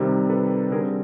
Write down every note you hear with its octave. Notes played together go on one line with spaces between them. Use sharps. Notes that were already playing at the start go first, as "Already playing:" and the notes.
Already playing: C3 D#3 G3 C4
A4 B4
D3 G3 C4 G#4 A#4